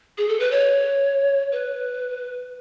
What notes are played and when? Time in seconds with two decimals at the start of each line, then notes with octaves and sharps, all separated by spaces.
0.18 G#4
0.28 A4
0.40 B4
0.51 C#5
1.52 B4